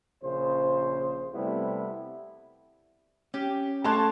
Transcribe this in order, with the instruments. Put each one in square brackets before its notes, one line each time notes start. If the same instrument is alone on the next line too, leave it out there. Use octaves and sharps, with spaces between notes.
[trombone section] A#1 C#3 C5
C3 G3 A3 B3 E4
[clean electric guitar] C#4 [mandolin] G4
[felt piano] A3 C6 F#6 [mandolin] A#3 F4 C#5 [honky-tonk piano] A5